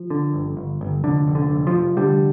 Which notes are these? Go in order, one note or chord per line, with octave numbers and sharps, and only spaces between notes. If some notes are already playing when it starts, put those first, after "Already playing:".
Already playing: F3
D3
G1
G1
G1
F1 D3
F1
D3
F1
F3
F1
D3 G3